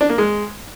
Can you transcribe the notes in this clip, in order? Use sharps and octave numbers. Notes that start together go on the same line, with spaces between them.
D4
A#3
G#3